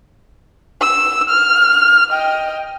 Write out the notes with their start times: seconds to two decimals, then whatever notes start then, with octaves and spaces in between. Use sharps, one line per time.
0.81 E6
1.30 F6
2.10 D#5 G5